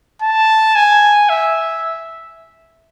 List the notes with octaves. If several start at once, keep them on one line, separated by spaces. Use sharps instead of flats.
A5
G#5
E5